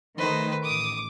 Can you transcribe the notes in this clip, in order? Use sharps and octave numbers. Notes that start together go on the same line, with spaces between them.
D#3 A3 B4 C5
A1 D6 D#6